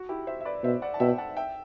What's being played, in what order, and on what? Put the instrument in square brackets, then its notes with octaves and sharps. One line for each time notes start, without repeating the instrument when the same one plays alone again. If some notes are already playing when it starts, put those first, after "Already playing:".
Already playing: [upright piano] F#4
E4 G4
C5 E5
E5
B4 D5
[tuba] B2 [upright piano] C5 E5
[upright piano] D5 F#5
A5
[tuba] B2 [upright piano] E5 G5
[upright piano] F#5 A5
E5 G5